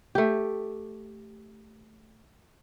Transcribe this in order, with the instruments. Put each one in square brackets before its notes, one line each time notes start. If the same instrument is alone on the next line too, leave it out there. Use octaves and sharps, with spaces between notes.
[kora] A3 G4